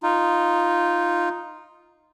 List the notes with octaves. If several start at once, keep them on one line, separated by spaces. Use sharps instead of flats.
D#4 F4